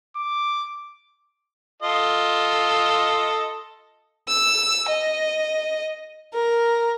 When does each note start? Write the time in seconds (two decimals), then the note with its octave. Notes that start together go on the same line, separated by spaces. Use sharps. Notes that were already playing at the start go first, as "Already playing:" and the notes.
0.17 D6
1.82 F4 A4 D#5
4.28 E6
4.88 D#5
6.33 A#4